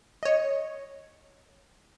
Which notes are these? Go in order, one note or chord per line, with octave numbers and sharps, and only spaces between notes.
C#5 D#5